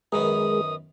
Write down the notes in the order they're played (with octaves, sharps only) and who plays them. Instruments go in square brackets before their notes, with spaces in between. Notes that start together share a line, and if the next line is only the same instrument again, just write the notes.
[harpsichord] F#2 D#3 B3 [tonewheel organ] G#3 G#4 A#4 [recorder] D#6